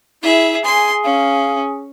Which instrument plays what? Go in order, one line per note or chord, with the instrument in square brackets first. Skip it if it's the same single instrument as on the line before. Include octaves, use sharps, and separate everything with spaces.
[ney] E4 [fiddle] G#4 E5
[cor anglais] G#4 [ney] G#5 [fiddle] C6
[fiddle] C#4 [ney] F5